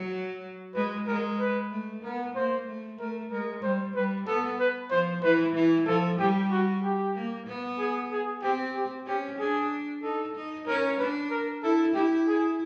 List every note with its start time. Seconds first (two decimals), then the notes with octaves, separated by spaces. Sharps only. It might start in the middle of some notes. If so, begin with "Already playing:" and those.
Already playing: F#3
0.75 G#3 B4
1.07 G#3 A#4
1.40 B4
1.71 A3
2.03 B3 A#4
2.35 A#3 C5
2.67 A3
2.99 A3 A#4
3.31 G#3 A#4
3.63 G3 C5
3.95 G3 B4
4.27 B3 A4
4.59 B4
4.91 F3 C5
5.23 E3 B4
5.55 E3
5.86 F3 A4
6.19 G3 G4
6.51 F#4
6.83 G4
7.15 A#3
7.47 B3
7.78 G#4
8.11 G#4
8.42 C4 G4
8.75 G4
9.06 C#4 G4
9.39 D4 G#4
10.03 D#4 A4
10.35 D#4
10.67 C#4 A#4
10.99 D4 B4
11.30 A#4
11.63 E4 A4
11.95 E4 G4
12.28 G#4